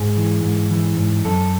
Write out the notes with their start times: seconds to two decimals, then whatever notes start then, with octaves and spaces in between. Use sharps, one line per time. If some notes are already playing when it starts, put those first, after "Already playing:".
Already playing: G#2 G#4
0.17 E3
0.43 G#2
0.71 E3
0.97 G#2
1.24 F#2 A4